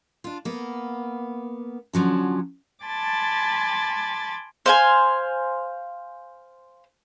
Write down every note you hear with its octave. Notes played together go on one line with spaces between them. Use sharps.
D4 F4
A#3 B3
D3 F3 F#3 C#4
G#5 A5 B5 C6 D6 A6
C5 F5 G#5